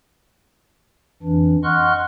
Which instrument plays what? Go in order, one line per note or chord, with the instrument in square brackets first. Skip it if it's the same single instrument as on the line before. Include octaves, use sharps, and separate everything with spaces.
[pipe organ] F2 E3 D4
D#5 F#5 C6 C#6 F6 F#6